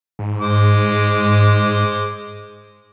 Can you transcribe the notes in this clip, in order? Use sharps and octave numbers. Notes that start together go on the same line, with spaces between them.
G#2
G#3 C5 D6